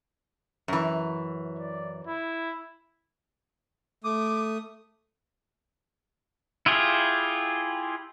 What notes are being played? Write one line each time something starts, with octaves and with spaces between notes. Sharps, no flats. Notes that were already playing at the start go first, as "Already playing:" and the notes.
F#2 E3
D5
E4
A3 D6 D#6
E4 F4 G4 G#4